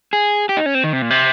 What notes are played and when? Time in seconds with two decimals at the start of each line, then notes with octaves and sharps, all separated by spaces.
0.13 G#4
0.49 G4
0.57 D#4
0.66 C#4
0.75 C4
0.84 D#3
0.93 C3
1.02 A#2
1.10 C3